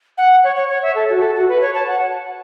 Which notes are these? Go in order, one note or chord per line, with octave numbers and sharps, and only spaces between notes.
F#5
C#5
C#5
C#5
E5
A4
F#4
A4
F#4
B4
C#5
A5
F#5